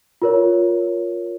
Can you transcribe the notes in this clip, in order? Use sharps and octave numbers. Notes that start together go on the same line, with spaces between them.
F4 A#4 C#5